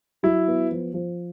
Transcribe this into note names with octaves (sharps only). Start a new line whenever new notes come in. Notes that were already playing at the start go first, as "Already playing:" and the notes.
F#3 E4
B3
F3
F3